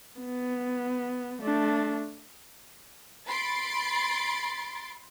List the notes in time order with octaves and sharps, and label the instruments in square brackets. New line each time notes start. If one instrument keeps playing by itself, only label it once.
[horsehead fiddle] B3
A3 D4
[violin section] B5 C6 A6 C7 D7